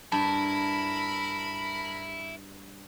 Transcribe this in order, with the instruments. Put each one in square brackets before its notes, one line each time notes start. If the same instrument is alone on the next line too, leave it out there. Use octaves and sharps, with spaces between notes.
[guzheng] G2 [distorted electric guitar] E4 [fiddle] A#4 B5 [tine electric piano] A5